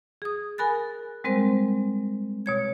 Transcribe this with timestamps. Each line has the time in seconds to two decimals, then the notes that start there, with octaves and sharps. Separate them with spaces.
0.22 G#4 D#6
0.58 A#4 G#5 B5 F#6 A6
1.24 G3 G#3 C4 A#4 C5
2.46 B2 C#5 G#6